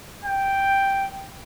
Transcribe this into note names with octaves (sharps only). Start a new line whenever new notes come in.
G5